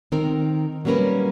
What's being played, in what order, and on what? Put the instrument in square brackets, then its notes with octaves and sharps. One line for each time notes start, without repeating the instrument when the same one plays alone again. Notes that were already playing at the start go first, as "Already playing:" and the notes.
[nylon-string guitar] D#3 C4 A#4
F#3 G3 A#3 C#4 A#4 B4